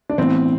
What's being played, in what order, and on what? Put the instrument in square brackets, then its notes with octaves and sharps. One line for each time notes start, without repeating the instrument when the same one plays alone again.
[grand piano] D4
[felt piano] A2 E3 B3 E4 [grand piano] C4